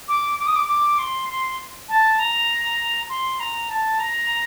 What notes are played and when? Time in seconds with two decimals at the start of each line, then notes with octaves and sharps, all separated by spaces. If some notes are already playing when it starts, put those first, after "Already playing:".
0.08 D6
0.39 D6
0.47 D#6
0.55 D6
0.68 D6
0.99 C6
1.29 C6
1.89 A5
2.19 A#5
3.09 C6
3.40 A#5
3.69 A5
3.99 A#5